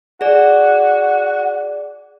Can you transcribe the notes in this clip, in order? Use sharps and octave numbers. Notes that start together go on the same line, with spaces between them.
F#4 G#4 D5